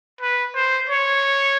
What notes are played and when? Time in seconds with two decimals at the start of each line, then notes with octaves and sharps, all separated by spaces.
0.21 B4
0.55 C5
0.89 C#5